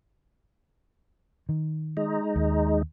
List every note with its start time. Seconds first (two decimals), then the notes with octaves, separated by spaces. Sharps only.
1.49 D#3
1.97 G#3 D#4
2.36 D#2